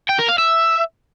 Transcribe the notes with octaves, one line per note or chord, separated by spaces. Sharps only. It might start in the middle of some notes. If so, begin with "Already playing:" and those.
G5
A#4
F5
E5